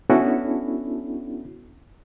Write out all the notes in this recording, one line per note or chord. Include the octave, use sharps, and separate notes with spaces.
B3 C#4 D4 E4 F#4 A4